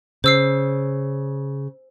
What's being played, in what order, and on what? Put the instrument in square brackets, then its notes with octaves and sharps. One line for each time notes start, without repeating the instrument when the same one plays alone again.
[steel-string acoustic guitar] C#3 [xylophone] C5 E6 C7